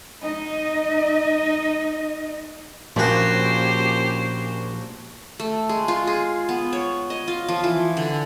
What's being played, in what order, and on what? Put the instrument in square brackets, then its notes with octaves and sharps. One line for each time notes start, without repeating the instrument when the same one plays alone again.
[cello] D#4 D#5
[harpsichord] A#1 F#4 [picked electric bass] A#2 [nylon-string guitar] F3 [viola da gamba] C#4 G4 C5
[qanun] A3
G#3
F4
G#4
B3
C#5
D#5
F4
F3
E3
D3